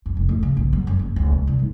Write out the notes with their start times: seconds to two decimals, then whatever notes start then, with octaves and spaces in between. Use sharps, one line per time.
0.06 F2
0.17 F1
0.29 A2
0.43 C#3
0.57 A#1
0.73 F#3
0.87 F#2
0.99 F#1
1.16 D1
1.32 C#2
1.47 C2
1.59 G#1